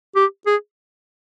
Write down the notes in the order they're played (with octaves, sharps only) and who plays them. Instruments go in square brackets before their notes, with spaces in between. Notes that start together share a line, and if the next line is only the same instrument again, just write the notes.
[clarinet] G4
G#4